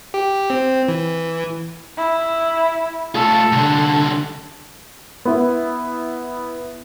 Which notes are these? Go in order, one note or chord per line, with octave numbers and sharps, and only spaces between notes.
G4
C4
E3
E4
A3 F4 A4
C2 D3
B3 E4